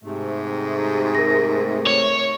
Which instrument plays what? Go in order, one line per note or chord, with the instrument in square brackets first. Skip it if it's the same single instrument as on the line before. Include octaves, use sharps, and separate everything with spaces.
[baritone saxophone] G#2 [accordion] C3 A3
[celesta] A#4 A#6
[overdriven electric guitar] C#5